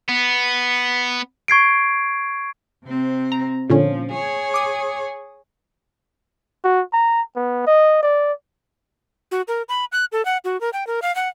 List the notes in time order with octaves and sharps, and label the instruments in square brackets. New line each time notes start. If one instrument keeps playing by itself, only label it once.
[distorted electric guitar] B3
[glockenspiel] C#6 G#6 C7 D7
[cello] C3 C4
[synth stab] A#5
[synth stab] A#2 D3 C#4 [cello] F3
[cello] G#4 C#5
[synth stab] D6 D#6
[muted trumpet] F#4
A#5
B3
D#5
D5
[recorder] F#4
A#4
B5
F#6
A4
F#5
F#4
A#4
G5
A#4
F5
F#5